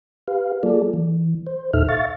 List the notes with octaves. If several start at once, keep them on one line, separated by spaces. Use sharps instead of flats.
G4 B4 F5
F#3 A#3 F4 G#4 A4 D5
E3
C5
D#2 A#2 D#4 A4 E5 F6
E5 F5 C#6 A6